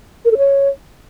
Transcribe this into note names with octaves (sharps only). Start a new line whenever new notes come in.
A#4
A4
C#5